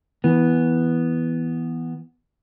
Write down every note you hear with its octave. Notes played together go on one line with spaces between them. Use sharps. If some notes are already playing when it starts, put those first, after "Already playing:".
E3 B3